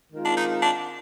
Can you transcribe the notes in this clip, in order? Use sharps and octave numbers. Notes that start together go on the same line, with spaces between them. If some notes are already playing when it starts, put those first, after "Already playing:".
D#3 G#3 C4 F4 A#4
D4
D#4
D4